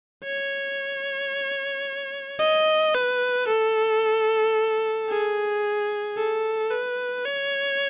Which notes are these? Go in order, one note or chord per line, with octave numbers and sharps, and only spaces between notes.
C#5
D#5
B4
A4
G#4
A4
B4
C#5